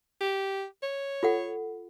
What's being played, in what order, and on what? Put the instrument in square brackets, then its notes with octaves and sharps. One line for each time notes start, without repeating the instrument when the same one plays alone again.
[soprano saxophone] G4
C#5
[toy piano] F4 A4 F#5